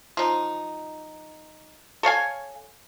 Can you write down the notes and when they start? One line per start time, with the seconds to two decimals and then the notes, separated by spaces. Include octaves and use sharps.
0.17 F3 D#4
2.03 A4 C#5 F5 G#5